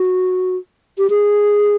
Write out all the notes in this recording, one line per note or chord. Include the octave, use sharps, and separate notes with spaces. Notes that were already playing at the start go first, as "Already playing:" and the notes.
Already playing: F#4
G4
G#4